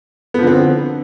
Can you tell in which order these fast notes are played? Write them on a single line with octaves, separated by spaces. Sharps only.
B3 F3 D3 C4